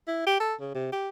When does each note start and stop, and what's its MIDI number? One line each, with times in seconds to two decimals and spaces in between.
0.08 0.23 64
0.26 0.36 67
0.40 0.54 69
0.61 0.72 49
0.75 0.87 48
0.92 1.09 67